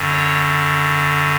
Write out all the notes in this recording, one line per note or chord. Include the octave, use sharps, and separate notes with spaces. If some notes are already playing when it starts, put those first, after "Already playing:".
Already playing: F#2 D3
C#5